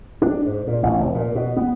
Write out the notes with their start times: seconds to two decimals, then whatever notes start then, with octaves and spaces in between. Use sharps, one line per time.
0.22 D4
0.46 G#2
0.67 A#2
0.83 A1
1.00 F1
1.15 A#2
1.35 B2
1.57 B3